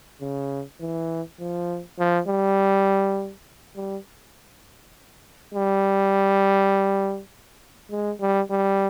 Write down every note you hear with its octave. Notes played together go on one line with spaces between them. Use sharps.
C#3
E3
F3
F3
G3
G3
G3
G#3
G3
G3